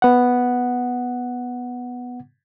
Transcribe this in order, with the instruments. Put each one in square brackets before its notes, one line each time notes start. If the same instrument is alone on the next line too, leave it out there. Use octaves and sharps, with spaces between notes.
[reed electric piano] B3 F#5